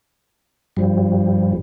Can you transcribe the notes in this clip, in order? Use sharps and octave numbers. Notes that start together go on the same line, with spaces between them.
G2 F3 G3